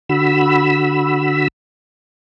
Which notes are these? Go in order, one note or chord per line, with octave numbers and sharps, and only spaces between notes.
D3 F#4 B5 E6